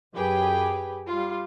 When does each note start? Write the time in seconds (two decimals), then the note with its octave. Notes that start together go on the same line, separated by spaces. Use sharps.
0.13 F#2 G4 G#4 B4 G5
1.09 G3 F4